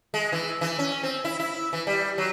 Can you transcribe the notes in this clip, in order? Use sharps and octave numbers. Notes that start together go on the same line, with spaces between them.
G#3
E3
E3
C#4
C4
E4
E4
E3
G3
F#3